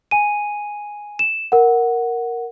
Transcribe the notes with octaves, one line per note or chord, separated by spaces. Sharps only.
G#5 D#7
E7
A#4 F#5